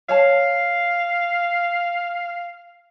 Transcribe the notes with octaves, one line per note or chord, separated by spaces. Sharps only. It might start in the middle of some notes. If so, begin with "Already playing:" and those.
C#5 F5 A5